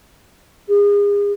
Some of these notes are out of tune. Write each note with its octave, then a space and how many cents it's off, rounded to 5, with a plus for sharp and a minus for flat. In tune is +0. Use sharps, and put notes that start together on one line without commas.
G#4 -35